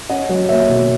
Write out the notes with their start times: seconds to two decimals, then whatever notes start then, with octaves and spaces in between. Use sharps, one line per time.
0.09 C#4 D#5 F#5
0.29 F#3
0.49 A#3 C#5 E5
0.69 B2